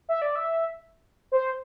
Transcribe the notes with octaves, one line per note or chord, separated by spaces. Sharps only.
E5
D5
E5
C5